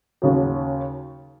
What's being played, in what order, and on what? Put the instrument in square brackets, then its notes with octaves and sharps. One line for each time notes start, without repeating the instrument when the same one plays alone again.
[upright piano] D#2 C#3 F#3